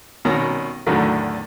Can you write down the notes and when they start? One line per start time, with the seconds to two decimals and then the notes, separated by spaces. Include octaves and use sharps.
0.25 C2 B2 D#3 C#4 A#5
0.87 E2 A2 D3 D#3 F#3